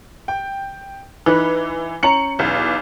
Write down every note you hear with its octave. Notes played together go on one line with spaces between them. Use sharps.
G5
E3 D#4 B4
C#4 A#5 C#7 F#7
B1 E2